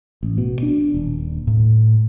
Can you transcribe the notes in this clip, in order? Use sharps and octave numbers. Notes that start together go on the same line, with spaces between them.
A1
B2
D4
D#1
A2